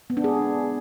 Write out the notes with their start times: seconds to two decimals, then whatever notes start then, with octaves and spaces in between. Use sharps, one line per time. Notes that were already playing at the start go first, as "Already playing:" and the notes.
0.10 B3
0.17 D4
0.24 G#4